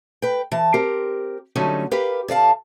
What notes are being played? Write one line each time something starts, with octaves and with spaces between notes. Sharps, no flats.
B4 G5
E3 A5
C4 G4 A#4
D3 F#3 G3 A3 C#4 D#4
G4 A#4 B4 F5
D3 D5 F5 A5